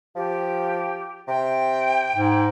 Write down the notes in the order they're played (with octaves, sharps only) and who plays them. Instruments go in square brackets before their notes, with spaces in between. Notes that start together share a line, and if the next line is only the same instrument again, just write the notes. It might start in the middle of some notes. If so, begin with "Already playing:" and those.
[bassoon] F3 [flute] G4
[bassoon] C3 [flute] G5
[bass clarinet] G#2